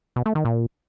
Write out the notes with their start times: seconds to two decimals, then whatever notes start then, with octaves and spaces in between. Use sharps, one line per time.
0.16 B2
0.26 A3
0.35 D#3
0.45 A#2